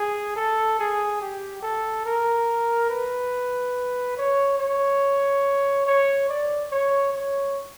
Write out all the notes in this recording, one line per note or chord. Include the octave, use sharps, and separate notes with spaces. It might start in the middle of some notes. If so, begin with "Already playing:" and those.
Already playing: G#4
A4
G#4
G4
A4
A#4
B4
C#5
C#5
C#5
D5
C#5
C#5